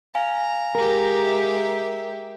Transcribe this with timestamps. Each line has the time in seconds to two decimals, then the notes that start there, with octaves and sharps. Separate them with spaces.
0.15 F5 G#5 A#5
0.75 G#3 G4 A#4
1.23 E5